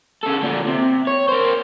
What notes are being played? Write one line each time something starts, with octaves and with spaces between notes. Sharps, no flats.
C#3 A4
A#2 D3
C3
C#5
A#3 C5